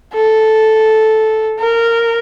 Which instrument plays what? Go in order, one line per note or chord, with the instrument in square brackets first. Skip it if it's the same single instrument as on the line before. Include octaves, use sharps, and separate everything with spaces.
[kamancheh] A4
A#4